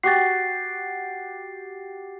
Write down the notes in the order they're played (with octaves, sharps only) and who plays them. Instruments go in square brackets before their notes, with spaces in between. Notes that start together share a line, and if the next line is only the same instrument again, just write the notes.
[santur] F#4 G4 [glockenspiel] A6 C7